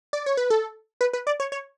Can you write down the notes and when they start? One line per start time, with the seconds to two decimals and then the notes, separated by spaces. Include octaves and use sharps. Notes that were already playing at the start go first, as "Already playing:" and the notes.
0.13 D5
0.26 C#5
0.37 B4
0.50 A4
1.01 B4
1.13 B4
1.27 D5
1.40 C#5
1.52 C#5